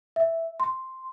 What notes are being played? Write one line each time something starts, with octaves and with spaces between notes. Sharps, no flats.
E5
C6